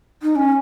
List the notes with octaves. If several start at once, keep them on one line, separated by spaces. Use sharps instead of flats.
D#4
C#4